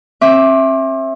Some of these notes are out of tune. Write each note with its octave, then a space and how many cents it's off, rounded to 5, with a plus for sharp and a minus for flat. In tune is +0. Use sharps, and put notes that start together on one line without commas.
C4 +40 E5 +0 D6 +0